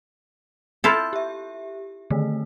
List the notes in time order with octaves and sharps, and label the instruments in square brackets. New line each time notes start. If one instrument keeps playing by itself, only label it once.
[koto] E4 F4 A4 [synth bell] G6
[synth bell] G4 E5
D3 D#3 A3